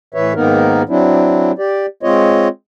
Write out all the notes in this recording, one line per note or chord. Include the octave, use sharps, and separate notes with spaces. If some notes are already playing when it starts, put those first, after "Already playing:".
A2 E3 B4 C#5 E5
G#2 D#3 A#3 B3 D#4 A#4
F#3 C4 D4 E4
G4 D5
G#3 C4 F4 C#5 D#5